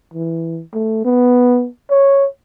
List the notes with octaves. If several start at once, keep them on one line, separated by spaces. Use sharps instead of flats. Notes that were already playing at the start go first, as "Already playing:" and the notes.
E3
A3
B3
C#5